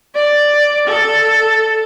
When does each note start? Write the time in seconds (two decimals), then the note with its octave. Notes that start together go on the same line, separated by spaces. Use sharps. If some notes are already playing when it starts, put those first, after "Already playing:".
0.15 D5
0.88 A4